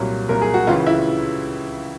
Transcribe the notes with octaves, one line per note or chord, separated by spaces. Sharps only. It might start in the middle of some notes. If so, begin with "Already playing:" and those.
Already playing: C2 A#2 F#3
C2 A#2 F#3 A#4
G#4
F#4
C#2 C#3 E3 F4
E4